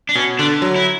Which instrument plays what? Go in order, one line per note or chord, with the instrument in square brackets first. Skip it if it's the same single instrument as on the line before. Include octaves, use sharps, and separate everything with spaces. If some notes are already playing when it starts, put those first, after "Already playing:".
[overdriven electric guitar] D4
[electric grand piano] B2 [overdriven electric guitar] C#4
[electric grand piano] D3 [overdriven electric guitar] D4
[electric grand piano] F#3
[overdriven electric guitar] E4